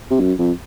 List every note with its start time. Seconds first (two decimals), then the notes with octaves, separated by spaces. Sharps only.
0.11 C3
0.20 F#2
0.39 F2